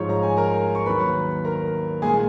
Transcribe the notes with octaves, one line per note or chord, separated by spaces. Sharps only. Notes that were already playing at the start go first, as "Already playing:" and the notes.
Already playing: G#2 F3 G#3 C#5 C#6
A#5
G#5
A#4 A#5
C#6
D#2 D#3 F#3 B4 B5
A#4 A#5
A#2 G#3 G#4 G#5